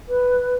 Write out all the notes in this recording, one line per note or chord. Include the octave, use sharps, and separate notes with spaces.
B4